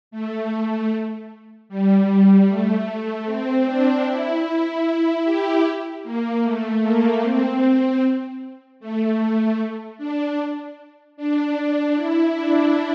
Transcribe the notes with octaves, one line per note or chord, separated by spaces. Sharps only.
A3
G3
A3
C4
D4
E4
E4
G4
A#3
A3
A#3
C4
A3
D4
D4
E4
D4